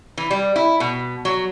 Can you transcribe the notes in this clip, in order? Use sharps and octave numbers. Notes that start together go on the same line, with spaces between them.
E3
G3
E4
B2
F#3